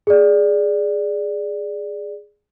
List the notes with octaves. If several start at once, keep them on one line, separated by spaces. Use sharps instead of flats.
G#4 D5